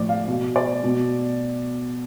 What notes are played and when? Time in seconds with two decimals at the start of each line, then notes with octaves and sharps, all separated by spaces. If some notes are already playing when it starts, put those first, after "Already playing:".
Already playing: A2 F3 D5
0.09 F5
0.28 B2
0.56 D5
0.84 B2